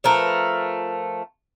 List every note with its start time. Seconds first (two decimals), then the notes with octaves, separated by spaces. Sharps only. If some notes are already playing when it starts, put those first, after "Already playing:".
0.04 F3 A3 A#4 B4